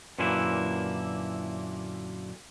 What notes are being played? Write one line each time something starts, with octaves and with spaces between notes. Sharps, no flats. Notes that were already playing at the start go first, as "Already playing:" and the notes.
F#2 A#2 D3 E3 A#3 E4